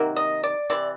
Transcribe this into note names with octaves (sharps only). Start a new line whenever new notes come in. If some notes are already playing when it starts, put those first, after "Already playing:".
Already playing: C3 D#3 F#3 A#3
D#5
D5
C3 E3 D5